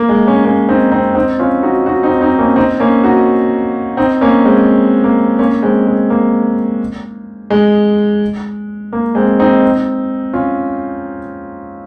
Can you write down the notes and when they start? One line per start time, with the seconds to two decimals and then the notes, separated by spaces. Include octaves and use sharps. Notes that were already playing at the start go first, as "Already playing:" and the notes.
Already playing: A#3
0.09 G#3
0.26 A#3 C#4
0.45 A#3 C#4
0.68 C4 D#4
0.92 C4 D#4
1.15 C4 D#4
1.39 C#4 F4
1.63 D#4 F#4
1.86 D#4 F#4
2.03 C4 D#4
2.21 C4 D#4
2.38 A#3 C#4
2.56 C4 D#4
2.80 A#3 C#4
3.04 D#4 F#4
3.97 C4 D#4
4.21 A#3 C#4
4.45 G#3 C4
5.04 A#3
5.39 A#3 C#4
5.63 G#3 C4
5.86 G#3
6.10 A#3
7.50 G#3
8.93 A#3
9.15 G#3 C4
9.39 C4 D#4
10.33 C#4 F4